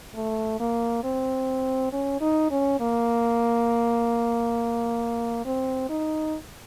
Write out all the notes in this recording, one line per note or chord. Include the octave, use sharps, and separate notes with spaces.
A3
A#3
C4
C#4
D#4
C#4
A#3
C4
D#4